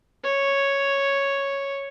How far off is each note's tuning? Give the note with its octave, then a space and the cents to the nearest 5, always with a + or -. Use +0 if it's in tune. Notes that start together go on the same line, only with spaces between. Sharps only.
C#5 +0